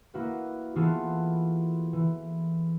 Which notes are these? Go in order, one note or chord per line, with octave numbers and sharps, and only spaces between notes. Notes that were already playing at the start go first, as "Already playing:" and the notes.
A#3 E4 F#4 B4
E3 B3 F4 F#4 G#4 A4
E3